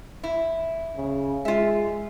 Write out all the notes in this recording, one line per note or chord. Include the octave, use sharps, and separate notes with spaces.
E4
C#3
G#3 F4 E5